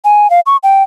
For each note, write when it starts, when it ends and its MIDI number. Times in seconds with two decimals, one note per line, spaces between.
0.05 0.30 80
0.30 0.40 77
0.46 0.57 85
0.63 0.83 79